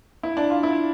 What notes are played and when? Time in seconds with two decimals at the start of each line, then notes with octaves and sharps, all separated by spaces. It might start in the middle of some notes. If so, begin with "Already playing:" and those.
0.23 E4
0.37 D4
0.50 F4
0.63 E4